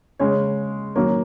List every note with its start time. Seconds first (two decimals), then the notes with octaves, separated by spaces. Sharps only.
0.19 C#3 G#3 C#5
0.95 D#3 F#3 A#3 C#5